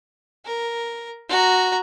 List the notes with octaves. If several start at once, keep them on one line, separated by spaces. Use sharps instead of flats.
A#4
F#4 A#5